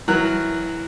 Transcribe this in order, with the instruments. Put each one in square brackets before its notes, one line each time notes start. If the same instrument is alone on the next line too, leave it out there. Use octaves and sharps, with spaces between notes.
[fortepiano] E3 F#3 A#4 F#6